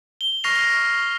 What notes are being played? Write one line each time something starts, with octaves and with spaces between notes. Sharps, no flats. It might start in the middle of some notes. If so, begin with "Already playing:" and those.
G7
C#6 F6 A#6 C7 F7